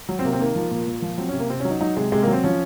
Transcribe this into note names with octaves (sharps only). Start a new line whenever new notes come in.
F#3
C4
C3 A#3
C4
D#3 A#3
F3
A#2
A#2
F3
F#3 C4
C#4
C3
A#3
C3 C4
C#4
F#3
D#4
F#3 D#4
C3 G#3
C3 G#3
A#3
F#3
C4
F3 C#4